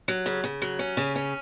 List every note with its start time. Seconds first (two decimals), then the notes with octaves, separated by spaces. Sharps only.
0.08 F#3
0.26 C#3
0.44 C#3
0.62 F#3
0.79 C#4
0.97 C#3
1.16 C#4